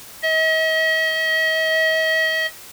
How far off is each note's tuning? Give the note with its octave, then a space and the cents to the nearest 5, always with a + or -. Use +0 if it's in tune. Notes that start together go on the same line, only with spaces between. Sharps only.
D#5 +45